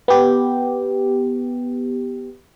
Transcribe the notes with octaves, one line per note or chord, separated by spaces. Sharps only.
B3 G4